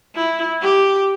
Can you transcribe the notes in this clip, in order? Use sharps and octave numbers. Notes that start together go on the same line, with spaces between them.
E4
G4